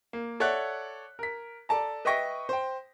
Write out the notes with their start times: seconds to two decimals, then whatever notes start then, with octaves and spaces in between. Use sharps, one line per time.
0.13 A#3
0.40 A4 C#5 D5 E5 F#5 F#6
1.19 A#4 B6
1.69 A4 D5 A5 A#5
2.05 B4 D#5 E5 G5 C#6 A#6
2.49 C5 G5